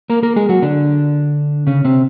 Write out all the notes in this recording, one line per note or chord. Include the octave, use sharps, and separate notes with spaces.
A#3 A#4
A#3 A#4
G#3 G#4
F#3 F#4
D3 D4
C#3 C#4
C3 C4